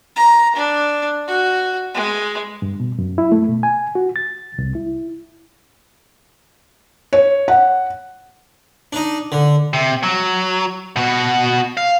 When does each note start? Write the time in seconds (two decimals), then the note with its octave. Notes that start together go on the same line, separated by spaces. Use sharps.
0.16 A#5
0.55 D4
1.28 F#4
1.94 G#3
2.62 G2
2.80 B2
2.99 F#2
3.18 E4
3.32 A3
3.48 B2
3.63 G#5
3.95 F#4
4.16 A6
4.58 C2
4.75 E4
7.13 C#5
7.48 F#5
8.93 D4 D#4
9.32 D3
9.73 C3
10.03 F#3
10.96 B2 F#4
11.77 F5